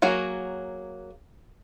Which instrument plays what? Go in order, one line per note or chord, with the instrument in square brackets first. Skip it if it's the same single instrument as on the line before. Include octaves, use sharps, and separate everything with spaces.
[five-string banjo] F#3 A#3 F#4 G#4